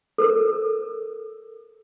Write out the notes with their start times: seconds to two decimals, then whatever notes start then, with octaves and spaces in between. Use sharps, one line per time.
0.18 A4 A#4